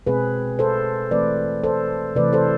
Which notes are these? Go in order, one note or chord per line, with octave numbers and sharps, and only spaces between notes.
B2 G#3 C4 G#4 B4
A4 C5
E3 A3 C4 B4 D5
A4 C5
C3 E3 A3 B4 D5
A4 C5